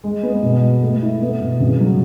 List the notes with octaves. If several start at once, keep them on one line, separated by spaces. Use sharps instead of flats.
G#3
B3
B2
G#3
A3
E4
B3
B2
C#3
F#3